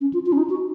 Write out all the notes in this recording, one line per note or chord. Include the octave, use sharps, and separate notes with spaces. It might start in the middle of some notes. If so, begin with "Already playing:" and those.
C#4
F4
F4
C#4
D#4
F#4